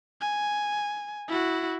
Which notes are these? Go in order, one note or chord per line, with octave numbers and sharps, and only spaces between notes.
G#5
E4 F#4